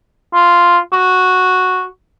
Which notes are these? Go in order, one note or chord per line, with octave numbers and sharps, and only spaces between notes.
F4
F#4